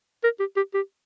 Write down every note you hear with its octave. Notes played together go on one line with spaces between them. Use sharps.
A#4
G4
G4
G4